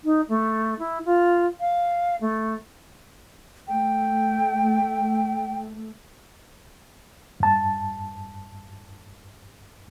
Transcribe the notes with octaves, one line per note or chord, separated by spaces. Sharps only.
D#4
A3
E4
F4
F5
A3
A3 G5
G2 A5